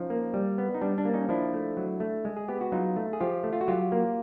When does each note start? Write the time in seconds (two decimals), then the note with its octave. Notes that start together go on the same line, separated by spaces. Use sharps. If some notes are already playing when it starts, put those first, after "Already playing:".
Already playing: F3 C#4 D#4
0.10 A#3
0.34 G3
0.58 B3
0.75 D#4
0.81 G3 D4
0.98 D4
1.05 A#3
1.14 C#4 D#4
1.29 F3 D4 E4
1.54 A3
1.77 F#3
2.00 A3
2.25 G#3
2.37 G#4
2.48 B3 G4
2.61 F#4
2.72 F#3 D#4 F4
2.96 A3
3.13 G#4
3.20 F3 F4 G4
3.44 A3
3.53 F4
3.61 F#4
3.67 F#3 F4 G4
3.92 A#3